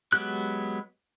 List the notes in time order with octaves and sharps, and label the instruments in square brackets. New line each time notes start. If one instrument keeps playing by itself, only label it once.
[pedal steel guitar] F#3 G#3 B3 G4 F#6